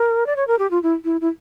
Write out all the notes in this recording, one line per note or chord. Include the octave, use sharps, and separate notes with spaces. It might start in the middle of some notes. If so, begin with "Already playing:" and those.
Already playing: A#4
D5
C#5
A#4
G4
F4
E4
E4
E4